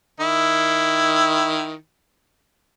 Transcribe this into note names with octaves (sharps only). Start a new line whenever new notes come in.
D#3 E4